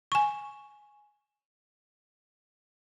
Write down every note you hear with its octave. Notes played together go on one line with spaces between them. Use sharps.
G#5 C#6